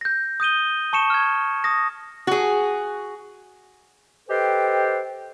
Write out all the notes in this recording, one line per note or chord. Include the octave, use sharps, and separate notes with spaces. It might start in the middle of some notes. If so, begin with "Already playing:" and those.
G6 A#6
D#6 G6 D#7 G7
A5 C#6 C#7 E7
F6 G#6
D#6 A#6
F#4 G#4
G4 A4 B4 C5 D#5 G5